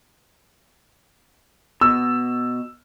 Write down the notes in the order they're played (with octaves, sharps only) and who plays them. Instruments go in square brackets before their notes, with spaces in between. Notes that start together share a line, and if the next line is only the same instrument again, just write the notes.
[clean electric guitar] B2 [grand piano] E6